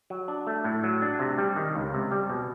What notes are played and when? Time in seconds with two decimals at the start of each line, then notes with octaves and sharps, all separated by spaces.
0.10 F#3
0.28 D4
0.47 A3
0.64 A2
0.84 F#3
1.02 D4
1.19 C3
1.38 G3
1.56 D#3
1.75 C#2
1.94 C3
2.11 G3
2.30 B2